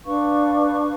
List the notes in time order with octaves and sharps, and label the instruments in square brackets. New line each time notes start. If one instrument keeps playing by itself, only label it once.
[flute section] D4 B4 F5 C#6